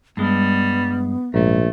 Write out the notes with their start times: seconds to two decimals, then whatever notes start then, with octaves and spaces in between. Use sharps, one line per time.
0.17 G2 G3 G#3 B3
1.34 A#1 G#2 A3